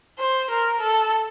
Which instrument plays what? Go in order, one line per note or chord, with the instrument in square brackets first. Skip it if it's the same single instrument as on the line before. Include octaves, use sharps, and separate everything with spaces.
[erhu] C5
A#4
A4